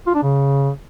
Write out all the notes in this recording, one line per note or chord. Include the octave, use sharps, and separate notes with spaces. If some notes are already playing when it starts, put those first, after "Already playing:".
F4
D4
C#3